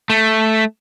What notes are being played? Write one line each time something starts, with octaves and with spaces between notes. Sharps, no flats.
A3